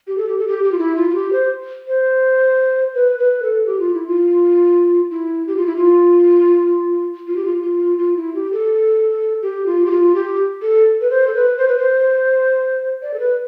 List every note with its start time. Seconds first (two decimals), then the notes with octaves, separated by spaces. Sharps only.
0.07 G4
0.17 A4
0.28 G4
0.38 A4
0.48 G4
0.64 G4
0.72 F4
0.78 E4
0.97 F4
1.10 F4
1.15 G4
1.32 C5
1.87 C5
2.94 B4
3.18 B4
3.42 A4
3.66 G4
3.80 F4
3.94 E4
4.07 F4
5.11 E4
5.47 G4
5.57 F4
5.66 E4
5.76 F4
7.27 F4
7.36 G4
7.45 F4
7.62 F4
7.98 F4
8.17 E4
8.34 G4
8.52 A4
9.42 G4
9.66 F4
9.86 G4
9.91 F4
10.15 G4
10.62 A4
11.01 B4
11.10 C5
11.27 A4
11.35 B4
11.58 C5
11.68 B4
11.78 C5
13.02 D5
13.14 A4
13.20 B4